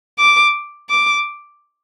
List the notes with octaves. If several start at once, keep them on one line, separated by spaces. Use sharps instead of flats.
D6
D6